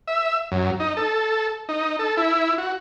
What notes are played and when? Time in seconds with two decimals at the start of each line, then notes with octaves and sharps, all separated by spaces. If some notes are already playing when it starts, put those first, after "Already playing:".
0.07 E5
0.52 F#2
0.80 D#4
0.97 A4
1.69 D#4
1.99 A4
2.17 E4
2.58 F#4